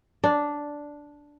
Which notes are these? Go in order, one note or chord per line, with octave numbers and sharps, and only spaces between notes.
D4